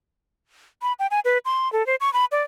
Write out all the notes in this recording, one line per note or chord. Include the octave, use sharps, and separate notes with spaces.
B5
G5
G#5
B4
C6
A4
C5
C#6
B5
D5